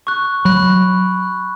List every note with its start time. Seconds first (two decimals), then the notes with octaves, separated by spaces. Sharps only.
0.07 C#6 F#6
0.45 F#3 B5 F#6